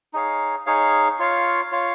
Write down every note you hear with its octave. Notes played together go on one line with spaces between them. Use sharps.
D#4 G#4 C#5 F5
D#4 G#4 C#5 F5
F4 C#5 F5
F4 C#5 F5